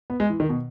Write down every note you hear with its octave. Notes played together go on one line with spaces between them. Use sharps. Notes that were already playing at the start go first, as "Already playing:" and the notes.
B3
G#3
E3
D#3
B2